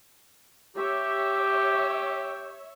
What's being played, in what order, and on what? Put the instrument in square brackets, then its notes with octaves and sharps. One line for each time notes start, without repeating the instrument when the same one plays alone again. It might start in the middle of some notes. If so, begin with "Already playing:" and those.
[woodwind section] G4 [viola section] C#5 E5